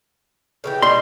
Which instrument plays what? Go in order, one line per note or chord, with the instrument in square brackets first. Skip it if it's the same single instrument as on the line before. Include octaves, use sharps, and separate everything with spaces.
[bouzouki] C#3 E3 G4
[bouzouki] B2 G3 G#3 [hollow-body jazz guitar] C6